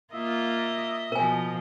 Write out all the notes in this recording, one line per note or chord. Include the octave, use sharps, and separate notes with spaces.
A#3 F4 D#5 E5
B2 F3 A#4 G#5